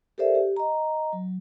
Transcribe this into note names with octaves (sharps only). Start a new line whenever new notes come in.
G4 A4 A#4 C5 D5 E5
G4
D#5 A#5
F#3